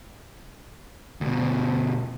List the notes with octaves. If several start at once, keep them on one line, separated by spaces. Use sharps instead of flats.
D2 B2